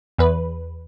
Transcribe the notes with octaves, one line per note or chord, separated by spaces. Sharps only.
E2 B4